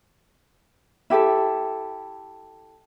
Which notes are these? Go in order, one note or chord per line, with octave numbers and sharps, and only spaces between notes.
E4 G4 A4